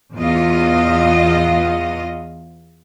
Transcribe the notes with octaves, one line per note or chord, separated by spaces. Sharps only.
E2 B3 F4 D#5